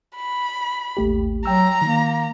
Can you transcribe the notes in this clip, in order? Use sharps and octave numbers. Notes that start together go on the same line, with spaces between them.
B5
A1 D#2 A3 G4
F#3 G5 A#5 E6
D#3 A#3